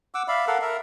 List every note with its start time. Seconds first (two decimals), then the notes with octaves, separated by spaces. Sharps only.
0.14 F#5 D6 E6
0.28 D5 E5 F5 B5
0.47 A4 A#4 F5 F#5
0.61 A#4 E5